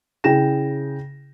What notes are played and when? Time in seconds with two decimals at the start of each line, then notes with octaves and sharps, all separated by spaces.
0.24 C#3 E4 G#4 G5 A#6 E7